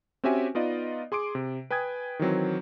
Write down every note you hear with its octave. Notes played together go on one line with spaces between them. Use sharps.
C4 C#4 F#4 G4 E5 G#5
B3 D#4 F4 D5 D#5
G#4 C6 D6 D7
C3
B4 G5 G#5 D#6 G#6
D#3 E3 F#3 C4